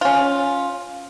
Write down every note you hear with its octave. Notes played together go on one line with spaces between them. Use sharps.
C#4 F4